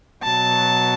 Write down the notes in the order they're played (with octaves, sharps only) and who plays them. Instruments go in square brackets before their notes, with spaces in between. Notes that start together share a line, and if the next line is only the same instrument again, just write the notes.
[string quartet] B2 F#3 A5